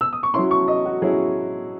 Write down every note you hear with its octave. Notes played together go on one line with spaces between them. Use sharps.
E6
D#6
C#6
F#3 C#4 E4 C6
C#6
D#5
F#4
F#3 C#4 E4 G#4